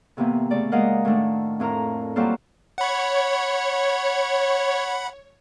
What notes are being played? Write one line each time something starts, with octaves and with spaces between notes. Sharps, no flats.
A2 C3 E3 A#3 B3
C#3 A3 D5
G#3 A#3 A#4 D#5 F5 F#5
A2 D#3 A3 D4
F2 A2 A#4 A#5
F#3 G3 A#3 F4 A4 C5
C#5 F#5 B5